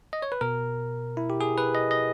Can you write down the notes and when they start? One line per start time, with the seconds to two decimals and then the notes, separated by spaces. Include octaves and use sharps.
0.13 D#5
0.22 C#5
0.32 B4
0.41 B2 A#4
1.17 E4
1.30 G4
1.41 G#4
1.58 B4
1.75 D#5
1.91 D#5